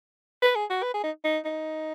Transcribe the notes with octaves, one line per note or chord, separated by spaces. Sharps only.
B4
G#4
F#4
B4
G#4
D#4
D#4
D#4